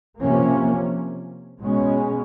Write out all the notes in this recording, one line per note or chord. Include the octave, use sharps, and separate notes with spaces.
C3 F3 A#3 C#4
B2 G#3 C#4